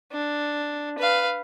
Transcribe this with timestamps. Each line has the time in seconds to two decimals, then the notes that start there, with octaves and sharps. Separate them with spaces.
0.12 D4
0.98 B4 F5